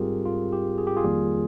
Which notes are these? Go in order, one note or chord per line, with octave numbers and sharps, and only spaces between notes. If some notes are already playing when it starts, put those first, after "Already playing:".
Already playing: G#2 G3 C4 F4 G4 G#4 A#4
F4
G4
G#4
G4
F4 G#4
F2 D#3 G3 A#3